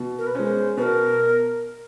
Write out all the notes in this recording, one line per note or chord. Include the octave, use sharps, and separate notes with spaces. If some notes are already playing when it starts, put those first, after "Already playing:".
Already playing: B2
A#4
B4
G#3 C#4 C5
B2 A#4 B4